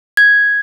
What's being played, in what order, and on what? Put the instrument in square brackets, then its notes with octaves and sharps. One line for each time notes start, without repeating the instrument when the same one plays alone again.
[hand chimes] G#6